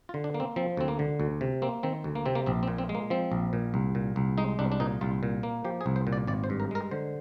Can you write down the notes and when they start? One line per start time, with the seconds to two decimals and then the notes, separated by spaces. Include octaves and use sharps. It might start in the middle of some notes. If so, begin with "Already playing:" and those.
0.09 F4
0.14 D3
0.24 D4
0.34 A#3
0.40 C4
0.56 F3 C4
0.77 D2 C4
0.88 A#3
0.99 D3
1.20 D2
1.41 C3
1.62 A#3 C4
1.83 D#3 C4
2.04 D2
2.15 A#3
2.25 C3 C4
2.35 A#3
2.46 A#1 C4
2.63 C4
2.68 A#2
2.78 C4
2.89 G#3
2.95 A#3
3.10 F3 C4
3.32 A#1
3.53 A#2
3.74 C2
3.95 A#2
4.16 C2
4.38 G#3 D#4
4.59 C2 D4
4.72 D4
4.80 A#2 D#4
5.01 C2 F4
5.23 A#2
5.43 A#3
5.65 F3 G4
5.81 G#4
5.86 C2
5.96 C5
6.07 A#2
6.13 D5
6.28 G#1 D5
6.44 C5
6.50 G2
6.60 A#4
6.71 G#3 A#4
6.91 D3 C5